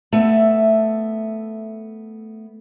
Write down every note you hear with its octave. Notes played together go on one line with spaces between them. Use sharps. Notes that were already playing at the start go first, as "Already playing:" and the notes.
A3 B3 E5